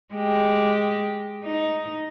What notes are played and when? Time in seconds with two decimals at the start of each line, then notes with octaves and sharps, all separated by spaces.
0.14 G#3 G4
1.44 D#4